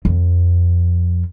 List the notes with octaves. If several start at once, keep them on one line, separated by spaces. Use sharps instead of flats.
F2